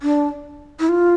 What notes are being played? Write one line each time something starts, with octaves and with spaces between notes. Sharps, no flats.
D4
E4
F4